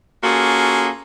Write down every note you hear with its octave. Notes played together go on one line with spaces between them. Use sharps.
A#3 C#4 F4 F#4 G#4 A4